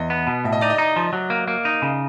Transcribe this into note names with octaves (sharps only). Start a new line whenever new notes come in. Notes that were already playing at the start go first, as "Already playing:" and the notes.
Already playing: E2 D#5
B3
B2
A2 E5
D#5
D#4 D5
D#5
D#4
F3
F#3
A#3
A#3
D#4
C#3